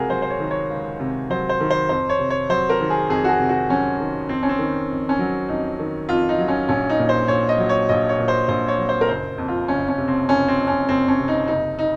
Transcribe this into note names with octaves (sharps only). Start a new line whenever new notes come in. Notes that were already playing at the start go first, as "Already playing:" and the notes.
Already playing: C#2 C3 F#4 G#4 A#4
F#3 C5
C5
C#5
D#3
C#5
C#2
C3
F#3 C5
C5
D#3
C5
F2 C5
C#5
C3
C#5
F#3 C5
A#4
D#3
G#4
F2 G#4
F#4
G#4
C3
F#4
F#3 C#4
D#3
F2 C4
C#4
C4
D#3
F2
C#4
F#3
F2 D#4
D#3
F2 F4
D#4
F#3
C#4
A#1 C#4
D#4
A#2
C5
A#1 C#5
D#5
F#3
C#5
A#1 D#5
C#5
A#2
C5
A#1 C5
C#5
F#3
C5
A#4
F#1 C5
F2
F4
F#1 C#4
C#4
C3
C4
F#1 C#4
C4
F2
C#4
F#1 C4
C#4
C3
D#4
F#1 D#4
D#4